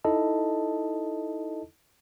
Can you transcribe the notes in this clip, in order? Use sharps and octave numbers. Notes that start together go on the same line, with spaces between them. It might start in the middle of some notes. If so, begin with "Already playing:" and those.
D#4 E4 A4 D#5 A5